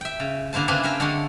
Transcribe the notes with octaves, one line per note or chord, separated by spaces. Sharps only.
E5 G5
C#3
D3 A#3 E4 C5 A5
C#3 A#3 C4 D4 G#4 B4
C5 E5 F5 G5 A#5
D3 G#3 A4 C#5 C6